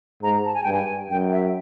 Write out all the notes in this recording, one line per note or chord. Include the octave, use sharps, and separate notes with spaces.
G#2 A#5
A5
G#5
G2 G5
G#5
F#2 G5
E5